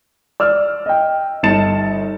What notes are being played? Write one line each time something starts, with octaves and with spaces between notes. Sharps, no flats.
D5 E6 F6
D#5 G5
G1 D#4 A5 A6 C#7 E7